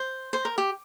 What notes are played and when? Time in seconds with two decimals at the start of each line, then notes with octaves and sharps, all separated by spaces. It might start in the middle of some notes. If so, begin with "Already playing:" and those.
Already playing: C5
0.33 C5
0.45 A#4
0.58 G4